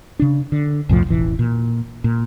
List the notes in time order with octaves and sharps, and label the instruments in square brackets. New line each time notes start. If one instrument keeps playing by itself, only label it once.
[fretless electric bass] C#3 D4
D3
B1 F2 A2 F3
E1 A1 E3
A#2
A#2